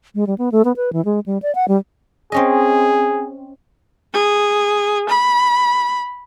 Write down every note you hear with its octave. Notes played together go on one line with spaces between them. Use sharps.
G#3
G3
B3
A3
B3
B4
E3
G#3
G3
D5
F#5
G3
C4 C#4 G#4 D#5
G#4
B5